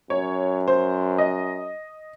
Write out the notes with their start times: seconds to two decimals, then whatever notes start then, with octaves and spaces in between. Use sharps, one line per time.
0.10 F#2 C#5
0.68 C5
1.18 D#5